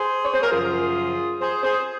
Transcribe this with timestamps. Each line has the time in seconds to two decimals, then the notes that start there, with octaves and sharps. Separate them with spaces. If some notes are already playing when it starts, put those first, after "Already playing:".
Already playing: G#4 C5
0.24 C#5
0.34 C5
0.42 A#4
0.51 F#2 C#3 F3 F4 G#4
1.41 G#4 C5
1.64 G#4 C5